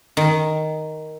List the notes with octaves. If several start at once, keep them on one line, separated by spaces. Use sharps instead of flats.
D#3